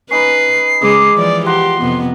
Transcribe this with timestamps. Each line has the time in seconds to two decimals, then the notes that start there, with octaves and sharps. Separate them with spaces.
0.11 C#4 D#4 B4 B5 C7
0.81 C#3 G#3 D#5 D6
1.15 E3 F3 D5
1.46 F4 G4 F#5 A#5 C6
1.81 F2 C3 B3